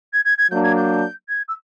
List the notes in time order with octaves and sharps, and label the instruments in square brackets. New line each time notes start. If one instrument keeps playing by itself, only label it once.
[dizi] G#6
G#6
G#6
[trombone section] F#3 A#3 D4 [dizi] G6
[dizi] G#6
G6
G#6
E6